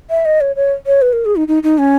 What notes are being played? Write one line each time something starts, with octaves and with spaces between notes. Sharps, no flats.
E5
D#5
C#5
C#5
C#5
B4
A#4
G#4
D#4
D#4
D#4
C#4